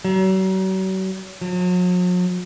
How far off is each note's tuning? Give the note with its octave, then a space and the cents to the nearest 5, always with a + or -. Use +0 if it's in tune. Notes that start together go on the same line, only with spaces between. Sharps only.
F#3 +40
F#3 -45